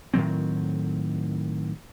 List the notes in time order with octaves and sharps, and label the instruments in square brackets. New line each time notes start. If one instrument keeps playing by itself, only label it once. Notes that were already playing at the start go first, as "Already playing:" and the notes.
[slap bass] A2 D#3 F#3 C4